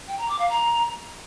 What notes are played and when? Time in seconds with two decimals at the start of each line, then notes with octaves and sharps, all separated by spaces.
0.08 G5
0.18 A#5
0.28 D6
0.39 F5
0.49 A#5